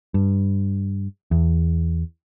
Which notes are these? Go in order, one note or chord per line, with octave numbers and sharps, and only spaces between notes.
G2
E2